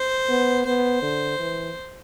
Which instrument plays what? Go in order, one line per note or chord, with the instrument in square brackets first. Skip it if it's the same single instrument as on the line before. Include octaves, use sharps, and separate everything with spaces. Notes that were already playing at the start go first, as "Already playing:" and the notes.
Already playing: [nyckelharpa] C5
[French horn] B3
[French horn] B3 [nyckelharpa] C5
[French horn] D3
E3